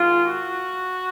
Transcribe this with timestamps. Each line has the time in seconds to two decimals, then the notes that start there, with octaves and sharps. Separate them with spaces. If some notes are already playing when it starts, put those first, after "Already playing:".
Already playing: G#2 D#3 G#3 F4
0.23 F#4